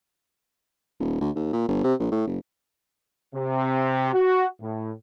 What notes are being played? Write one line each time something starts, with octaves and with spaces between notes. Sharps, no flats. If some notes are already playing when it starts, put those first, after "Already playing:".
D#1
D2
D#2
A#2
G1
C3
A#1
A2
F#1
C3
F#4
A2